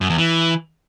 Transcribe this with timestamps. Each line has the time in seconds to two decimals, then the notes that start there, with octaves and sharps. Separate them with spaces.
0.01 F#2
0.10 E2
0.18 E3